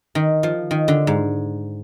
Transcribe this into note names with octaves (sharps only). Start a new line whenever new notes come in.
D#3
F3
D#3
D3
G#2